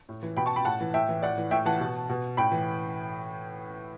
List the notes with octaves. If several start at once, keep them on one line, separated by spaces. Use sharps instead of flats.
A2
E3
B2 G5 B5
A5 C#6
G5 B5
A2 F#5 A5
E3
A2 E5 G5
E3
A2 D5 F#5
E3
A2 E5 G5
E3 F#5 A5
B2
B2
A2 G5 B5
E3